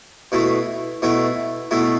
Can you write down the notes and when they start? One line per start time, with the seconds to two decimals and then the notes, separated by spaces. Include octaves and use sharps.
0.32 B2 A3 E4
1.02 B2 A3 E4
1.71 B2 A3 E4